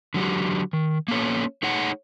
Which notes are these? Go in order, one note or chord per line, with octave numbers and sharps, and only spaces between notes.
D3 F#3 F#4 G4
D#3
A#3 B3 C#4 A4 C#5
A3 D#4 G#4 C#5 F#5